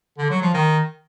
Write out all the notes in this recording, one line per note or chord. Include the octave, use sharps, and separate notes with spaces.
D3
F#3
F3
D#3